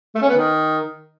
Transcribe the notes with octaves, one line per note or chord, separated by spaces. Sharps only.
A3
C#4
B3
D#3